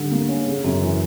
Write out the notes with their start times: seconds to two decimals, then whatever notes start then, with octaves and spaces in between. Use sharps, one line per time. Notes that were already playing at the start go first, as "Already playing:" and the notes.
Already playing: D3 G3
0.11 A#3
0.29 C#4
0.47 C#3
0.64 F#2
0.82 E3